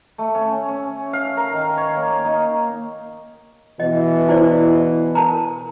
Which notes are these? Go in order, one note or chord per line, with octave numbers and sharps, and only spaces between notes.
A3
C#4
C#4
F5
A#4
D#3
C#5
A#3
D#4
B2 E3 D#5
E4 C5 D5
A#4 A5 A#5